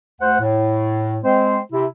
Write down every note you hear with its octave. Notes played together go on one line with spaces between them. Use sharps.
D2 C5 F#5
A2
G#3 C4 C5
C3 E4